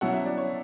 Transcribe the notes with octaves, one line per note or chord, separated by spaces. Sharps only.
B2 F#3 C#4 E4 F#5
E5
D5
C#5